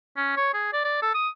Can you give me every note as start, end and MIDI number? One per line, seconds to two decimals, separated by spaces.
0.17 0.36 61
0.36 0.49 73
0.54 0.70 68
0.73 0.81 74
0.84 1.01 74
1.02 1.12 69
1.14 1.28 87